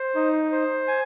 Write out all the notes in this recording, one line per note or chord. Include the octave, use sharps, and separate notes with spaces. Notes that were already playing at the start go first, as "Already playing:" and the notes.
Already playing: C5
D#4
C5
G#5